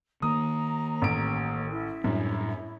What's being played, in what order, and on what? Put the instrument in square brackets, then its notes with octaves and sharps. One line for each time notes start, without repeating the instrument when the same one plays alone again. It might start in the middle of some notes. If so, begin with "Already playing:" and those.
[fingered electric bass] D#3 A#3 [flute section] A#5 [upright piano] D#6
[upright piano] A1 D7
[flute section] E4
[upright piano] F#2 [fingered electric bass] A2 G3 D4